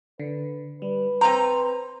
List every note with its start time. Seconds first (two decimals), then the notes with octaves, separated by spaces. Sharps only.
0.20 D3 B4
0.82 G3 B4
1.21 C4 C5 A#5